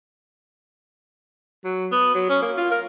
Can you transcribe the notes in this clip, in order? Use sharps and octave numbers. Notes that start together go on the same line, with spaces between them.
F#3
B3
F#3
C#4
A#3
F4
A#4